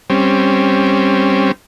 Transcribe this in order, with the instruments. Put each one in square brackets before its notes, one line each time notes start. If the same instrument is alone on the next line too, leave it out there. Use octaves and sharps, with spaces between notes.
[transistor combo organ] G3 C4 C#4